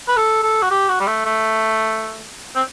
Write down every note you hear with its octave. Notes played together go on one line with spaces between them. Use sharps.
B4
A4
A4
F#4
G4
F#4
G3
A3
A3
C4